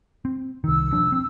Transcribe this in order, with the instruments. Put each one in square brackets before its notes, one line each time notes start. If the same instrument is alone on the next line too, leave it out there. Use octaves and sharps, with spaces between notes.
[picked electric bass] C4
[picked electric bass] C2 D#3 [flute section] E6
[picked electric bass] E1 F3 D4
C4